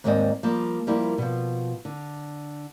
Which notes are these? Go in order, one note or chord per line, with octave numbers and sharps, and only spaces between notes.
D#2 G#2 A#3 C4 D5 D#5
F3 G3 A#3
F3 G3 A#3 E4
B2 F3
D3